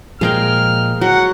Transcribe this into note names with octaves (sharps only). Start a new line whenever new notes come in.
A#2 F3 G#3 G#4 A#4 G5 F6
F#3 F#5